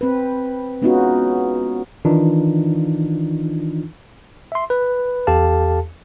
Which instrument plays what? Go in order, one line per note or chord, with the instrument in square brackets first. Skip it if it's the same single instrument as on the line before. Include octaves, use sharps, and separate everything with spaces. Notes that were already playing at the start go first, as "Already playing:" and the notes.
[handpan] C4 B4
G#3 B3 C#4 D#4 F4 F#4
[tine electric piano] D#3 E3 D4 D#4 F4
E5 C6
B4
E2 G4 A4 F5 A5